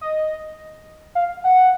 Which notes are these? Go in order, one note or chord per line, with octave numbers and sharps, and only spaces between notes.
D#5
F5
F#5